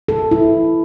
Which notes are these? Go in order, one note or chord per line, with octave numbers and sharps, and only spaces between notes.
A4
E4